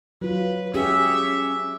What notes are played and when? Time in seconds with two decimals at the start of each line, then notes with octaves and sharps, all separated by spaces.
0.22 F#3 F4 B4
0.74 C#4 G4 G#4 E5